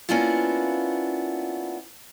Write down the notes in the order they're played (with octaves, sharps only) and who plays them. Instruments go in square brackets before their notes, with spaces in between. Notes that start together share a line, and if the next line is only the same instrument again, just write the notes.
[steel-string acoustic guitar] A#3 B3 C#4 D4 E4 F4